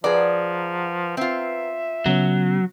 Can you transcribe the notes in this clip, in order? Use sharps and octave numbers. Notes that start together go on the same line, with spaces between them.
F3 G#4 B4 D5 F#5 A#5
C4 F4 E5
C#3 F#3 B3 C#4